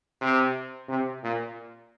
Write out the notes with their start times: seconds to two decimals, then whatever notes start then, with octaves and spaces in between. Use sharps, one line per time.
0.21 C3
0.89 C3
1.23 A#2